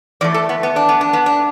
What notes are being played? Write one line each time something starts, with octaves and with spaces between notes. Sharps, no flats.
E2 E3 A3 D5
A4
B3
B3
D4
B3
D4
B3
D4